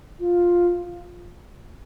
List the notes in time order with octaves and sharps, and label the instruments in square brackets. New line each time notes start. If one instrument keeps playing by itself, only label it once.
[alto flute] F4